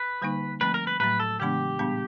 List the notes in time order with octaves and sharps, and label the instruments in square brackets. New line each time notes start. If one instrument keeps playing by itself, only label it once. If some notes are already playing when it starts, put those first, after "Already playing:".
Already playing: [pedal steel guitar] B4
[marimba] D3 G3 A#3 D#4
[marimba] F3 A3 C4 [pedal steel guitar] B4
[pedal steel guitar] A#4
B4
[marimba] A2 F#3 A3 [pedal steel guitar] B4
[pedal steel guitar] A4
[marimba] C#3 E3 G#3 B3 D4 [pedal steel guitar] G4
[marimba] A#2 G3 B3 D4